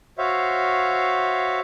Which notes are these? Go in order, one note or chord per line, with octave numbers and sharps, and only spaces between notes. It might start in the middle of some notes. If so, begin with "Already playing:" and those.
F#4 C5 C#5 E5 F5